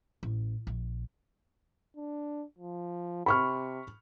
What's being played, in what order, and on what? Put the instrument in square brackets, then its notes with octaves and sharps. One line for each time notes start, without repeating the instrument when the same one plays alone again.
[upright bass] A1
A#1
[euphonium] D4
F3
[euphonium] C3 [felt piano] B5 C#6 F6